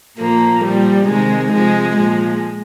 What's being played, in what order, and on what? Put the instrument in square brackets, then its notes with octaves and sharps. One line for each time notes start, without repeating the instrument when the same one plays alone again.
[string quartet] A#2 F3 A#3
A#2 F3 G3
C3 D#3 G#3
C3 F3 G#3
A#2 F3 G#3